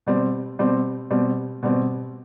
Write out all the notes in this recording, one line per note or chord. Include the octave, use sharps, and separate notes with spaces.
B2 G3 C4
B2 G3 C4
B2 G3 C4
B2 G3 C4